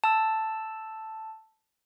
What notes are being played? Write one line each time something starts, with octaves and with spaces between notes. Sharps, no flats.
A5 E6